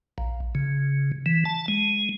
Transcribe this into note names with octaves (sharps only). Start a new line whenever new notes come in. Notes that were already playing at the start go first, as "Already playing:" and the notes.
A#1
C#3
E3
A5
G#3